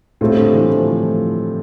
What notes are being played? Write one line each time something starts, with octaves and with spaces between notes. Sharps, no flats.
A2 G3 A3 C4 F4
D3
E3
F3